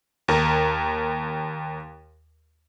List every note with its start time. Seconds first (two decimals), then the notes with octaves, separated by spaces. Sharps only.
0.28 D#2 A#4